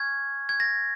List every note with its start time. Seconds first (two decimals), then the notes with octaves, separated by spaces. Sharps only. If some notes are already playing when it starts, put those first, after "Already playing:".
Already playing: G#5 C#6 F6 G#6
0.49 G#6
0.60 A#6